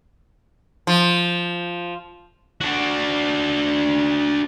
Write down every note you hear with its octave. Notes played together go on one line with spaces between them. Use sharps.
F3
D4 F#4